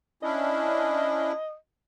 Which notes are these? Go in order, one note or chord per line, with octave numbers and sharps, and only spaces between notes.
C#4 D4 E4 D#5